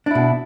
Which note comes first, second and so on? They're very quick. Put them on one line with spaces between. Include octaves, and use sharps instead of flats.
D4 E4 B2